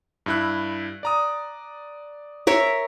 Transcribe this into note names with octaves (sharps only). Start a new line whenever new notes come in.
G2 E4 F#6
D5 A#5 D#6
A#4 C#5 E5